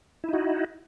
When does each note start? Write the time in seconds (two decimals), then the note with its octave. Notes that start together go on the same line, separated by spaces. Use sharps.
0.24 E4
0.29 D#4
0.33 F#4